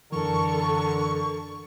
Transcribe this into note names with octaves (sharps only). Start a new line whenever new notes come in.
F#2 D3 E3 A4 A#4 C#6